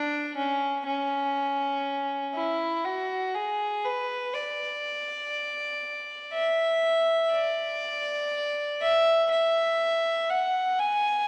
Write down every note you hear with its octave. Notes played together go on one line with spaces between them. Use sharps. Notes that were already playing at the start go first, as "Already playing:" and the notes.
Already playing: D4
C#4
C#4
E4
F#4
G#4
B4
D5
E5
D5
E5
E5
F#5
G#5